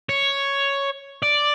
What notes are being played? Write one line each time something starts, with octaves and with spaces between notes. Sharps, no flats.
C#5
D5